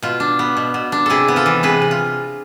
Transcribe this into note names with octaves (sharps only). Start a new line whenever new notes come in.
B2 F4
D4
B3
B2
B2
D4
C3 E4 G#4 A4
B3
F4 A4
E3
C3 G#4 B4
C3
F4